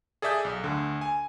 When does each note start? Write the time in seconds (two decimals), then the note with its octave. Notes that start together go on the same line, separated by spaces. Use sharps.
0.22 G#4 A4 D5 E5 D#6 G6
0.45 B1
0.64 D2 D3
1.01 G#5